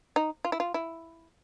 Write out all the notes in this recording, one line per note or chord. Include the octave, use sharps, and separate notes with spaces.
D#4
F4
E4
F4
E4